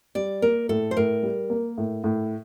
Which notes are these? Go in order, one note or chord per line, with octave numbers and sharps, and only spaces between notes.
G3 D5
A#3 A#4
A2 A4
C5
A2 A#4
G3
A#3
A2
A2